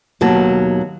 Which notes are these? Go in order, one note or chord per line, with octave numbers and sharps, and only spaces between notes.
D#2 B2 F#3 A5